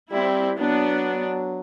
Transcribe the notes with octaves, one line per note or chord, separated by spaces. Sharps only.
G3 C4 E4
F#3 B3 D4